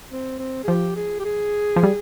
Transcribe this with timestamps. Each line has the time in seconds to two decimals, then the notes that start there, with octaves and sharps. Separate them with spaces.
0.11 C4
0.39 C4
0.64 G#4
0.68 F3 G4
0.96 G#4
1.19 G4
1.25 G#4
1.76 F3
1.83 G3